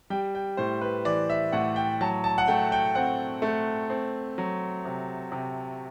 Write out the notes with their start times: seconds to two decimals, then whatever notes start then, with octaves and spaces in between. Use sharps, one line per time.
0.10 G3 G5
0.35 G5
0.57 A2 C5
0.81 B4
1.05 E3 D5
1.30 E5
1.52 A2 F#5
1.76 G5
2.01 F#3 A5
2.24 A5
2.38 F#5
2.48 A3 G5
2.72 G5
2.95 C4 F#5
3.42 A3
3.90 C4
4.38 F#3
4.85 C3
5.32 C3